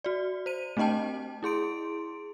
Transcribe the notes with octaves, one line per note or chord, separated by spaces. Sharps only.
F#4 D5
C5 D#7
A3 C4 D4 D#5 G5 A5
E4 G#4 C6 D7